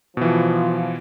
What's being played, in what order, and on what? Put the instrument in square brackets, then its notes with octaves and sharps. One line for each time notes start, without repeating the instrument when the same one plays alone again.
[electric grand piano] B2 E3 [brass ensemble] F3